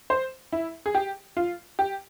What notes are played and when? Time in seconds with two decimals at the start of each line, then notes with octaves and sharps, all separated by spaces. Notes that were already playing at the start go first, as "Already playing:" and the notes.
0.10 C5
0.52 E4
0.86 G#4
0.95 G4
1.37 F4
1.79 G4